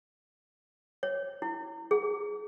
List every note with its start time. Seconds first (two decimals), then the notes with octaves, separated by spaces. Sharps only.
1.03 C#5
1.42 E4
1.91 G#4